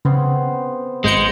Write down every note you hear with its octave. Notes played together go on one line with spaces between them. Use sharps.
C#3 B3 C4 C5
G#1 G#3 G6 C#7